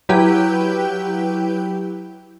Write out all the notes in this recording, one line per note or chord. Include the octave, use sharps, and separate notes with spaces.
F#3 E4 G4 B4 G5 G6